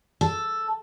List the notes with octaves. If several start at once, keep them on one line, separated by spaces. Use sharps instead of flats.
A4